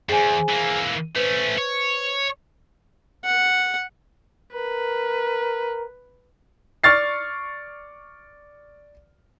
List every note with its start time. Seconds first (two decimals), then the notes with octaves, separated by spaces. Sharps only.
0.09 E2 G2 G#4 C5 G#5
0.49 E3 A#3
1.16 A3 C#4 B4 C5
1.58 C#5
3.25 F#5
4.53 A#4 B4
6.84 D5 C#6 F6 A6 C7